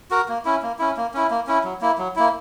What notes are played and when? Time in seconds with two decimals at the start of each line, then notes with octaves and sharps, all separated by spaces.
0.11 F#4 A#4
0.28 A#3
0.45 C#4 E4
0.62 A#3
0.79 C#4 E4
0.97 A#3
1.14 C#4 E4
1.31 A#3
1.47 C#4 E4
1.64 F#3
1.81 A#3 E4
1.98 F#3
2.16 A#3 E4